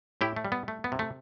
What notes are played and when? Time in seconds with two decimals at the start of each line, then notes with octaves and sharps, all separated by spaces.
0.21 A2 E4 G4
0.36 A3
0.45 G3
0.52 B3
0.68 A3
0.84 B3
0.92 C3
0.99 A3